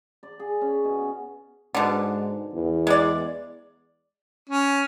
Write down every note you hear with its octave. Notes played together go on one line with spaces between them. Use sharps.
D5
G#4
C#4
B2
G#2 B2 D3
E2
G#3 D5
C#4